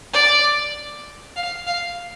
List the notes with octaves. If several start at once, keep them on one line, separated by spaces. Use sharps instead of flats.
D5
F5
F5